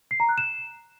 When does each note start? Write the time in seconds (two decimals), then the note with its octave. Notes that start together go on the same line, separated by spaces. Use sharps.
0.11 C7
0.20 A#5
0.29 F#6
0.38 E7